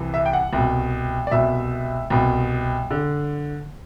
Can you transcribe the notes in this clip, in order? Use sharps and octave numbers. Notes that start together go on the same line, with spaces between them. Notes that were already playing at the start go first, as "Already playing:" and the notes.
Already playing: C2 C3 E3
E5
G5
F#5
C2 B2
D5
C2 B2 E5
C2 B2
D3